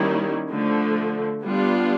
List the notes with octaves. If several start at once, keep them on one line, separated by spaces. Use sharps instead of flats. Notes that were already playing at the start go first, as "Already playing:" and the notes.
Already playing: D#3 G3 A#3 C#4 E4
D3 F3 A3
G3 B3 D4 F4